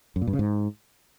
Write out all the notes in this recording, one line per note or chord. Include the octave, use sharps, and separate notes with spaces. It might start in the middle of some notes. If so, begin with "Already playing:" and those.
F#2
A#2
G2
C#3
G#2